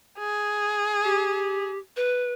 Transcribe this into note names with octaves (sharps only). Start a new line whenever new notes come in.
G#4
G4
B4